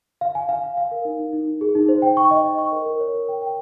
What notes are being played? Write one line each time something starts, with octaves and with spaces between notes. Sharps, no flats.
F5
G#5
F5
F5
F5
A#4
D#4
D#4
D#4
D#4
G#4
D#4
C5
G5
C#6
D#5
D#5
C#6
A#4
A#4
C#5
A#4
G5
G5